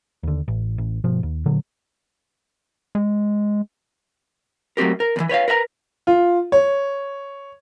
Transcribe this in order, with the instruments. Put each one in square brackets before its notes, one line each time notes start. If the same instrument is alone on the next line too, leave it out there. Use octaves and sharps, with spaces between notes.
[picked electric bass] D#2 D3
A1
A1
G1 B2 F3
D#2
A#2 D3 F#3
[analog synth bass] G#3
[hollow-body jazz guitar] F#3 A3 C4 G4 A#4
A#4
E2 E3
B4 C#5 E5 F5
A#4 B4 E5 A#5
[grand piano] F4
C#5